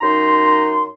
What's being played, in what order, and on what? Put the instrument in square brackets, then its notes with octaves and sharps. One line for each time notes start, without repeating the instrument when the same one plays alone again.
[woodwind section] F#2 D#4 A#5 C6